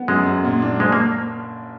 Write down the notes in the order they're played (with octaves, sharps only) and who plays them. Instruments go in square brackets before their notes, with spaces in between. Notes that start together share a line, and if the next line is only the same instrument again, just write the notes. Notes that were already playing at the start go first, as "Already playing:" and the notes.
Already playing: [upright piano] B3
[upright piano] F#2 [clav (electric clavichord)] G#3
[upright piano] F#2
A#2
D4
[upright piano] F#1 [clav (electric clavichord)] G#3
[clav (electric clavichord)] A#3